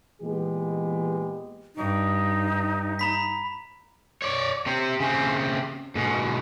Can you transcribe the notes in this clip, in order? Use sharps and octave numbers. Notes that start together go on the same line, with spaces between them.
A#2 E3 G#3 B3 G4 G#4
G2 D#4
A#5 B5 B6
C#5 D5
C3 C4
C#3 C4
G#2 B2